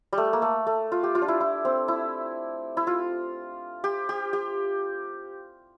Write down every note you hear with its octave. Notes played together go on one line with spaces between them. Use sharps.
G3
A3
A#3
A3
A3
F4
G4
F4
D4
E4
E4
C4
E4
E4
F4
G4
G4
G4